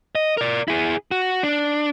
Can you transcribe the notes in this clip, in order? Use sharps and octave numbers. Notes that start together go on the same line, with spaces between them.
D#5
A#4 D5
E4 G#4
F#4
D4